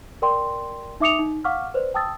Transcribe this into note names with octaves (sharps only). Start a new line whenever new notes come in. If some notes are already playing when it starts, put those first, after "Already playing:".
A#4 D5 G5 C6
D#4 E5 D6 D#6 C#7 F7
D#4
F5 F#5 C#6 D6 F6
B4 C5 D5
G5 A5 D#6 E6 A6